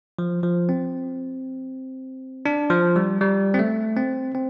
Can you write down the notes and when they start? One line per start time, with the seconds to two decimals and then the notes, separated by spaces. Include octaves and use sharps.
0.19 F3
0.43 F3
0.69 C4
2.46 D4
2.70 F3
2.96 G3
3.21 G3
3.54 C4
3.59 A3
3.96 C4
4.35 C4